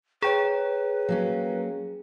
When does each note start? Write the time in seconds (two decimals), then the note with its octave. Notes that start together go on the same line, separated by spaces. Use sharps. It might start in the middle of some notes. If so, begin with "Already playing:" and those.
0.22 G#4 B4 C#5 G5 A#5
1.09 F#3 A#3 C#4